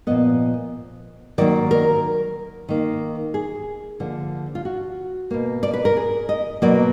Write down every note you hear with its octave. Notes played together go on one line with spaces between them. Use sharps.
A#2 F3 B3 D#5
D#3 F#3 A#3 D5
A#4
D#3 A#3
G#4
D3 F3 A#3
F4
F#4
B2 A#3
D5
B4
A#4
G#4
D#5
B2 F#3 A#3 D5